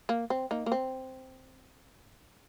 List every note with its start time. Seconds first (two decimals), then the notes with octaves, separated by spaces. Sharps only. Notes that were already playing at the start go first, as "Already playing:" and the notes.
0.09 A#3
0.30 C4
0.51 A#3 D#4
0.66 A#3
0.72 C4